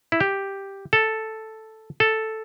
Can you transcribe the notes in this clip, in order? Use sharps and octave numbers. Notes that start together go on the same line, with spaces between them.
E4
G4
A4
A4